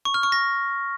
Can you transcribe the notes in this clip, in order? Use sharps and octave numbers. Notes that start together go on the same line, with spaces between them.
C#6
F6
C#6
A#6